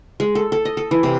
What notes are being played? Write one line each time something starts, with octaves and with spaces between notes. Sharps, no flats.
G#3
A4
A4
D#5
A4
E3
C3